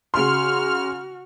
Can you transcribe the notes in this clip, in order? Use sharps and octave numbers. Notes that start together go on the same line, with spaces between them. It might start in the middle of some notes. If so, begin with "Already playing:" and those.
C#3 F#4 C6 F6